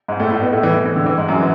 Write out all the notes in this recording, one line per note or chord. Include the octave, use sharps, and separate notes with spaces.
G#2 G#3
A2 A3
A2 A3
B2 B3
A2 A3
E3
E3
E3
D3
E3
G#2 G#3
F#2 F#3
E3